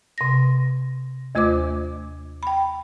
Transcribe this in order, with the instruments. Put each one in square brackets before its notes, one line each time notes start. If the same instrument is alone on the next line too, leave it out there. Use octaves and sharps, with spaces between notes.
[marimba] C3 A#6
D#2 A3 F4 C5 D#5 D6
G5 B5